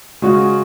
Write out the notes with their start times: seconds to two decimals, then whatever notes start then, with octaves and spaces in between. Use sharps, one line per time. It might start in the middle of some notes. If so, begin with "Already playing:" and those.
0.22 C#3 G#3 C#4 F#4